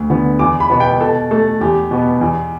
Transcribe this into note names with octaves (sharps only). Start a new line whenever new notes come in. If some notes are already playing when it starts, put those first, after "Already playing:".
Already playing: D2
D3 B3
E2 D6
B5
B2 B3
G5
B2 A4
A3 A4
E2 G4
B2 B3
E2